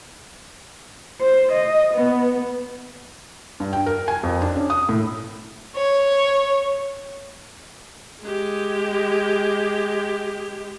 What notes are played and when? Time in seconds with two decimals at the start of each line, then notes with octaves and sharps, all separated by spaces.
1.21 C5
1.52 D#5
1.94 B3
3.60 G2
3.73 G5
3.86 A#4
4.08 G#5
4.23 F2
4.42 D4
4.56 C#4
4.70 D#6
4.89 A2
5.76 C#5
8.22 G#3 G4